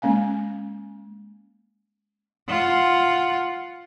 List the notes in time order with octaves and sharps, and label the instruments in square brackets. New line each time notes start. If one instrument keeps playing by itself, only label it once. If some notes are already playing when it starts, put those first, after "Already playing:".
[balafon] G#3 A#3 C#4 F5 G#5
[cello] F4 F#5